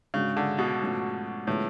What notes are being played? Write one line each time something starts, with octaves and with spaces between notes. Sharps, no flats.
G#2 C#3 G#3 D4 F#4
D3
B2
G#2 F3 A3 C#4 F#4
A2 D3 F3 G#3 B3